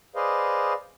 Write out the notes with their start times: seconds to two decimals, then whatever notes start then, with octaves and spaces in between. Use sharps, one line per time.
0.16 G#4 B4 C5 D5 D#5 F5